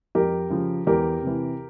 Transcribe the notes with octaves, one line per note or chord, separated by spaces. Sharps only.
F2 G4 A#4
C#3 F3
E2 G4 A#4
C3 E3